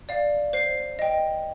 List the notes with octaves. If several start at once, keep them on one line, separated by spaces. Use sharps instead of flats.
D5 F5
C5 C7
D#5 G5